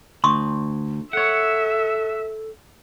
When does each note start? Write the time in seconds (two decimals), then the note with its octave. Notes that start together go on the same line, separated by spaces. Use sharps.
0.24 D2 C6 C#6 D#6
1.13 A4 C#5 E5 F#5